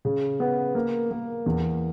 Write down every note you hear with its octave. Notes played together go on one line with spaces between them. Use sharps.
C#3
B3
A#3
A#3
E2